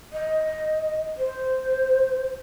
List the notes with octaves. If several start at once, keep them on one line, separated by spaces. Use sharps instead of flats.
D#5
C5